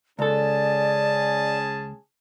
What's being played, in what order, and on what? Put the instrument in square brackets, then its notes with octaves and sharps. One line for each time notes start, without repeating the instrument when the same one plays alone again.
[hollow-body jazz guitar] C#2 A4 [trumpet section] C#4 G#4 A5 [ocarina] D5